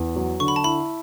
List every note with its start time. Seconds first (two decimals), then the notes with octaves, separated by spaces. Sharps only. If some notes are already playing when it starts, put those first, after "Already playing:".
Already playing: E2
0.16 F#3
0.40 D3 C#6
0.48 B5
0.56 A5
0.64 E4 B5